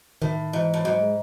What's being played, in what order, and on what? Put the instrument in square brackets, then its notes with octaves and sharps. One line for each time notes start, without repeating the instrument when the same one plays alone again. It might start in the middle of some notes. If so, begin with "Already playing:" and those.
[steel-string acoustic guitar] A2 [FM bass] D#3
[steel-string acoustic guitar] G#2 [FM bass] E3
[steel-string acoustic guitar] A2
[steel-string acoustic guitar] G#2 [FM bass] F#3
[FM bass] G#3